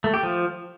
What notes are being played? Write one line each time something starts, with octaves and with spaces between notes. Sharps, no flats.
A3
G4
F3